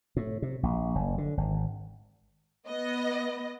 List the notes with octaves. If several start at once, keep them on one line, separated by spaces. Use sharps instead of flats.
A2
C3
A#1
F#1
D3
G#1
B3 D#5